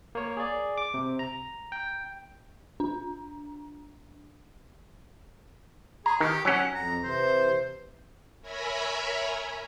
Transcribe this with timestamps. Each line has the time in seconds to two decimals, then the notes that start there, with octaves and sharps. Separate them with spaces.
0.15 A#3 C#5
0.37 G#4 D5
0.78 D6
0.94 C3
1.19 A#5
1.72 G5
2.80 D4
6.06 G#4 A#5
6.20 D#3 G4
6.45 F#3 C#4 F#5
6.74 F2 A#5
7.04 C3 E3 C5
8.42 A#4 C#5 E5 G#5 A#5 B5